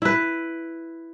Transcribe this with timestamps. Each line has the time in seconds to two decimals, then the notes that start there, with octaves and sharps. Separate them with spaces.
0.02 E4 B4